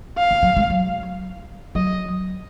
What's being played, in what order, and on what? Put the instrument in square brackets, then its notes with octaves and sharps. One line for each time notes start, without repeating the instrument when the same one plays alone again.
[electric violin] F5
[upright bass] G#3
F#3
G#3
F#3
[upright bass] F#3 [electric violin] D#5